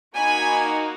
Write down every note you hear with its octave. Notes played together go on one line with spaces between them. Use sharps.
A#3 D#4 F#4 G#5 B5